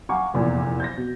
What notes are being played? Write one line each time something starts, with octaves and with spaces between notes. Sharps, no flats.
F5 F#5 G#5 A#5 C#6 D6
F1 E2 A#2
G6 A6 A#6
B2